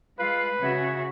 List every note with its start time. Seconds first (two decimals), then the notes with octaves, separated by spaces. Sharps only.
0.19 G#3 F4 B4 F5 F#6
0.62 C#3 C#4 F#4 E5 G#6